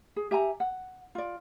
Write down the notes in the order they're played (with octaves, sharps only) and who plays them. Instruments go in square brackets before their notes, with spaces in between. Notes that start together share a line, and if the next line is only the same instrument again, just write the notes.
[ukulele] G#4
G4 E5 G#5 A#5
F#5
F4 D5